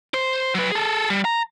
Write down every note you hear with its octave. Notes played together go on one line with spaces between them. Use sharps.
C5
F#3 B4
G#4 A4
G3
A#5